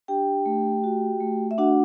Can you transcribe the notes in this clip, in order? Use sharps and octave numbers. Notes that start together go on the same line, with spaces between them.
D4 G4 G5
A3
F#4
A3
E5
D4 F#4 F#5